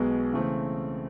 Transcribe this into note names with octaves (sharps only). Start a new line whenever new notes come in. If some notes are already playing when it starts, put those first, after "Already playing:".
Already playing: B1 B2 G#3 B3
C#3 E3 A3 C4